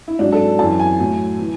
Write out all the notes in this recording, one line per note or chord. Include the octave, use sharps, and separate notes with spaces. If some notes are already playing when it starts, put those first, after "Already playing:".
E4
G#2 F#3 D4
A4
F#2 E3 A5
G#5
A2 F#3
E3